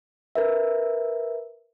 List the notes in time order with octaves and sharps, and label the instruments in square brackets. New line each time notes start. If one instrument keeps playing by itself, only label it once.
[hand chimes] A#4 B4 E5